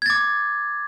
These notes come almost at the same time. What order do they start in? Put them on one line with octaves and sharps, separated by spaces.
G#6 A6 D6